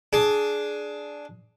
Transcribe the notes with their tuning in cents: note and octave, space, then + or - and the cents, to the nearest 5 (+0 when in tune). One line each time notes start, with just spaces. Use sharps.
D4 +0 G#4 +15